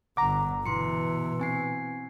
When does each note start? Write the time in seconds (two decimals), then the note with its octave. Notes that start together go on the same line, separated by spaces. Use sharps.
0.17 G1 D3 F#5 A#5 D6
0.66 B2 E3 E4 C6 C#7
1.39 C4 G#5 C7